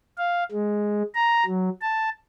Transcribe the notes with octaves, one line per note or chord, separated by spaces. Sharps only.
F5
G#3
A#5
F#3
A5